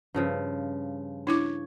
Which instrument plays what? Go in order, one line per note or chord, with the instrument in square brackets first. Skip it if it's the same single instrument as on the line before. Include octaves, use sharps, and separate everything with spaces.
[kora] G2 C#3 F3
[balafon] D4 E4 D6 [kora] C#5